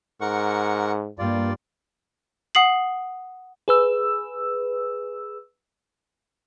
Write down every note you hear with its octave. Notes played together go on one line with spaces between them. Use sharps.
G#2 A#4 F#5 C#6
G2 G3 A#3 F4 D5
F#5 D#6 C7 F#7
G#4 B4 E6